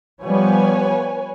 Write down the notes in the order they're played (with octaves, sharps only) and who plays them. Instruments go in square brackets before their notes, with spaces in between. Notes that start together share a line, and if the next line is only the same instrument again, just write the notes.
[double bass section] F3 G3 B3 [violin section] B4 C#5 G#5